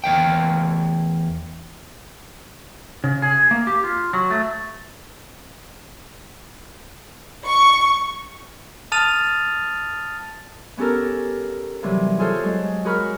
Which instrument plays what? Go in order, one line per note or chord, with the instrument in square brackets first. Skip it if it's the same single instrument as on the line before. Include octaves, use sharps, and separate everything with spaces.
[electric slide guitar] E2 A#4 G5
C#3
G#4
A#3
G4
F4
F#3
A3
[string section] C#6
[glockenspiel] A5 D#6 F6 A6 D#7 F7
[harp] B3 C#4 G4 A4 A#4
C3 E3 F#3 G3
F4 G#4 A4 C5 C#5
F#3 G#3
F#4 G#4 A#4 B5 C#6 F6